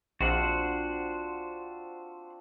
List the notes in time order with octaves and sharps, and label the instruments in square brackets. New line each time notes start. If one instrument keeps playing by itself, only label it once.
[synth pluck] A#1 [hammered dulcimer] C4 D4 F4 [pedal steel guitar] F#4 C5 F#5